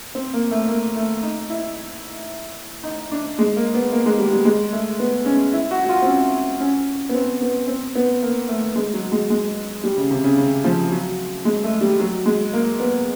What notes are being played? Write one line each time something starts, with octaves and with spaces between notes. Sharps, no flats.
C4
A#3
A3
A#3
A3
D#4
E4
D#4
D4
G#3
A#3
B3
A#3
G#3
G3
G3
G#3
A3
B3
C#4
E4
F#4
F#4
F4
C4
C#4
C#4
B3
C4
B3
C4
B3
A#3
A3
G#3
F#3
G#3
G#3
G3
C#3
C3
C#3
C#3
F3
F#3
G#3
A3
G3
F#3
G#3
A#3
B3